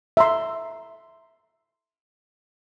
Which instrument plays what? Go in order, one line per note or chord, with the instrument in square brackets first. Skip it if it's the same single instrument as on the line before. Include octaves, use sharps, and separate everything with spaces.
[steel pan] E5 A#5 C6